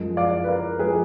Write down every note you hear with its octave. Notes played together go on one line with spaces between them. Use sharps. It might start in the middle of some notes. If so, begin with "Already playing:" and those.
Already playing: F#2 F3 G#3
D5 F5
B4
A#4 D5
F3 G#3 G#4 B4